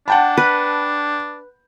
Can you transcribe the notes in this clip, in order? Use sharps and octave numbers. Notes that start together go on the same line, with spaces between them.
D4 F#5 G5 A5
B4